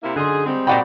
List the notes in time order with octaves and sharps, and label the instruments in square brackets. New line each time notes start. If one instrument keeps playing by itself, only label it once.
[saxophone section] C3 A#3 E4
[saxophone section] F#2 D#4 G#4 [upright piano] D3 C6
[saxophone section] G3 G#3 C4
[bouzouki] A#2 D#4 G5 [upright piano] F#4 D5 B5